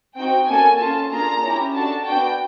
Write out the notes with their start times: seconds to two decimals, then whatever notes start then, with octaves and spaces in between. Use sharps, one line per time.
0.17 C4 D#4 F#4 G5
0.48 A#3 C#4 F#4 A4 G#5
0.80 C#4 F4 A4 A5
1.11 A#3 D4 F4 G#4 A#5
1.43 C#4 E4 G4
1.74 D4 F#4 A4 A5
2.06 B3 D4 F#4 G5